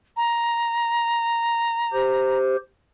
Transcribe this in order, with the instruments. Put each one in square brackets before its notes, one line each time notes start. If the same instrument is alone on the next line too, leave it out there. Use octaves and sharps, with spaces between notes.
[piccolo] A#5
[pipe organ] G4 C5